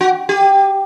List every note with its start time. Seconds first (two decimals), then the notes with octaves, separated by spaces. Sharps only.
0.01 F#4
0.29 G4